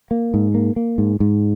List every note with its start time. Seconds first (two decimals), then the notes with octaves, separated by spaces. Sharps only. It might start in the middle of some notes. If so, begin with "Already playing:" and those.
0.11 A#3
0.34 G#2
0.54 A#3
0.76 A#3
0.98 G#2
1.20 G#2